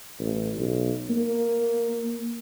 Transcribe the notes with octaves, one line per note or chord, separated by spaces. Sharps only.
A1
B1
A#3